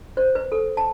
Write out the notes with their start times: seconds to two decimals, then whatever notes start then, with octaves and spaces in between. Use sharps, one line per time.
0.17 C5
0.35 B4
0.52 A4
0.77 A5